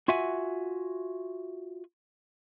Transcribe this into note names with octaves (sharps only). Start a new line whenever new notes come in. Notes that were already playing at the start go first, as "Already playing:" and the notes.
F4 F#4 E5 F#5 G#5